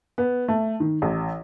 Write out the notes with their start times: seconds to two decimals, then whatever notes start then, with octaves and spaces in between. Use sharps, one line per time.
0.18 B3
0.48 A3
0.80 D#3
1.02 A1